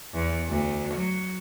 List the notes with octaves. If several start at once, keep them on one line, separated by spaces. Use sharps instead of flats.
E2
D2
F#3